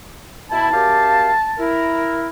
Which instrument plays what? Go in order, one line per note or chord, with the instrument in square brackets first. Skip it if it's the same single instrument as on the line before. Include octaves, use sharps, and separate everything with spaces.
[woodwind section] B2 E4 [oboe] A5
[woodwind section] F#2 G4 F5
E4 A#4